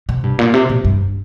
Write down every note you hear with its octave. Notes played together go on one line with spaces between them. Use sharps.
C3
G2
A#2
C3
A#2
G2